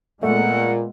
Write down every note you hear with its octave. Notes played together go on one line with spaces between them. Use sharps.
A#2 G#3 A3 B3 F#5